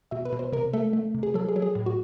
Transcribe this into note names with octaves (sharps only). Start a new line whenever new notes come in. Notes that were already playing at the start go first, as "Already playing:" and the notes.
B2 E5
B4
B2
C5
C3 A#4
A3 A4
A3
C3
G#4
F#3 A4
G#4
F#3
G#4
A2
F#4